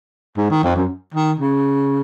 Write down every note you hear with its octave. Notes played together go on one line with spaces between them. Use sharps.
G#2
D#3
F2
F#2
D#3
C#3